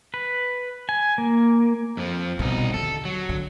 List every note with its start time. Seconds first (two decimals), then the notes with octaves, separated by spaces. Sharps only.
0.14 B4
0.89 G#5
1.18 A#3
1.97 F2 F3
2.39 C2 B2 D#4
2.74 D#2 D3 A4
3.05 F#3
3.29 D3